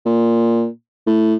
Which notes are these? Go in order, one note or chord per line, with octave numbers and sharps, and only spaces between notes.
A#2
A2